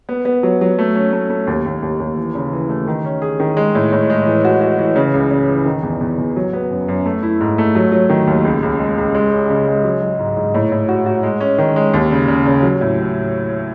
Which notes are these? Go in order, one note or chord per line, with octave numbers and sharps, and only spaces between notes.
B3
B3
F#3
F#3
A3
C#4
A3
A3
D#2
D#2
D#2
D#2
E3
C#3
E3
A3
D#3
C#4
G#4
D#3
G#3
A2
A2
G#3
E3
F#4
F#4
E3
C#3
C#2
C#3
E3
D#3
E2
E2
E2
F#3
B3
F#2
F#2
A3
E4
G#2
A3
F#3
F#3
D#3
D#2
C#2
C#2
G#3
C#2
G#3
C#4
C#3
G#3
F#3
F#3
G#2
G#2
A2
A2
F#4
F#4
G#3
C#4
D#3
G#3
D#2
C#3
C#3
C#3
F#3
A2